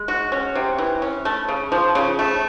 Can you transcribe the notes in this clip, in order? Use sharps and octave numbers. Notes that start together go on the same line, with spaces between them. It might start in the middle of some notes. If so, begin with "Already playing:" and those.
Already playing: G#3
F#4
C#4
C3
E3
C#4
A3
C#3
F3
C#3
A3